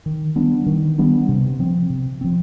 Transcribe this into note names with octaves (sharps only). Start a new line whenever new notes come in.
D#3
G3 B3 D4
D#3
G3 B3 D4
C3
F3 C4
C3
F3 C4